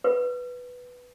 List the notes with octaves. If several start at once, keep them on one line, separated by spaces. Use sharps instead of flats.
B4